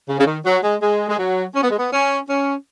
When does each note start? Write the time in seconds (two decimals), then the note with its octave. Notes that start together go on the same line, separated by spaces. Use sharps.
0.08 C#3
0.19 C#3
0.26 D#3
0.44 F#3
0.63 G#3
0.81 G#3
1.09 G#3
1.18 F#3
1.55 C#4
1.62 B3
1.70 G#3
1.78 B3
1.92 C#4
2.28 C#4